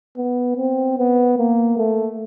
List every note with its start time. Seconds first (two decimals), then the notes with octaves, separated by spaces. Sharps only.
0.17 B3
0.57 C4
0.98 B3
1.38 A#3
1.77 A3